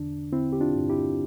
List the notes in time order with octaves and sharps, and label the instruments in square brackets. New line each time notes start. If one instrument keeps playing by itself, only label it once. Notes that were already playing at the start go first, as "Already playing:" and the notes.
Already playing: [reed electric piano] E2 D3 D4
D3 C4 E4
G4
D4 F4
G2
E4 G4